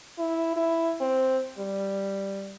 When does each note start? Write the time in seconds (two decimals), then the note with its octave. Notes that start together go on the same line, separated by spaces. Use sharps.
0.19 E4
0.56 E4
1.01 C4
1.58 G3